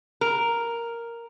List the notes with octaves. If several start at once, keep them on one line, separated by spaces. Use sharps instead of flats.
A#4